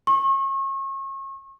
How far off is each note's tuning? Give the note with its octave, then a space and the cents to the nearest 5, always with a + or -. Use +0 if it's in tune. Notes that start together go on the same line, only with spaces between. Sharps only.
C#6 -35